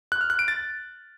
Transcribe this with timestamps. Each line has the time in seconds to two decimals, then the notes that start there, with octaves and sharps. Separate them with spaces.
0.12 F#6
0.21 F6
0.30 F#6
0.39 D7
0.48 A6